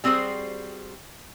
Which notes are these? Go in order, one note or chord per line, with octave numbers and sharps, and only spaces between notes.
G3 C4 F#4 G#4 C5